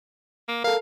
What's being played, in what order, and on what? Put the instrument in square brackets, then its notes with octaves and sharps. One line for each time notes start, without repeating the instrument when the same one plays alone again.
[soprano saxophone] A#3
[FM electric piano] A4 A#4 [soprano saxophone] F5